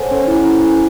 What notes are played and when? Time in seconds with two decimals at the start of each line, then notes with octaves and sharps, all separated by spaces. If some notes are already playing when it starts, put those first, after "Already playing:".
Already playing: A4 C5 C#5 F#5 G#5
0.11 C#4
0.28 E4
0.45 C#4
0.63 E4